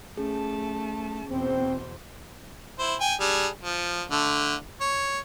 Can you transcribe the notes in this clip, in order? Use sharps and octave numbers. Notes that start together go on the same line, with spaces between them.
A3 C#4 G#4 A5
E2 B2 C4 C5
E4 C5
G5 G#5
G3 D4 G#4
F3
D3 A3
C#5